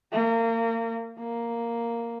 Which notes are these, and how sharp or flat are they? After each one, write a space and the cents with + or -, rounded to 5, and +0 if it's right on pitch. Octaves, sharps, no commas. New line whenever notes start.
A#3 -30
A#3 +0